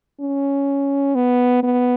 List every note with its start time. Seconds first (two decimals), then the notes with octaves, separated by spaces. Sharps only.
0.21 C#4
1.15 B3
1.63 B3